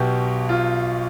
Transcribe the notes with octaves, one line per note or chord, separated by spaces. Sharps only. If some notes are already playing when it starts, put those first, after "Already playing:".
Already playing: B1 B2 G4
F4